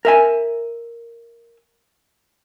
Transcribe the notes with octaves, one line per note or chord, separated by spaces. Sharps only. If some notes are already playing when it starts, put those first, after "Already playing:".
A#4 E5 G#5